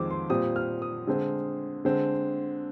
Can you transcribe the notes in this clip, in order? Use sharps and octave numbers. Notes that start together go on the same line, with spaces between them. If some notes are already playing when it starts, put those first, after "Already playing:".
Already playing: F2 D#3 G#3 C4 D6
C6
A#2 G3 C4 D#6
F6
D#6
D3 G#3 C4
D3 G#3 C4